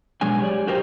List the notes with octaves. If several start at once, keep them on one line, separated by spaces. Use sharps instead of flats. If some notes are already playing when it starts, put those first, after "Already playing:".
B2 F#3 G#3 D4 G#5
G4 C#5 D5
F#4 G4 A#4 C5 G5